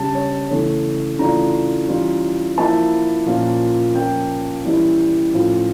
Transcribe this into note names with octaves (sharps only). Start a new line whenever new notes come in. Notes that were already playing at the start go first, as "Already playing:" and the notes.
Already playing: C#3 G3 D4 A5
C#5
C#3 E3 A3 C#5
C#3 E3 A3 D4 F4 A#5
E3 G3 C#4 F4
F3 A#3 E4 A5
A#2 F3 A#3 C#4 F4
F3 A#3 C#4 G5
E3 G3 A#3 C#4 E4
A2 F3 C#4 F4